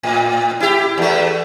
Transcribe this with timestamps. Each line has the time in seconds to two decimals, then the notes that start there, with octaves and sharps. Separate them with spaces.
0.03 A2
0.60 E4 G4
0.98 E2 A3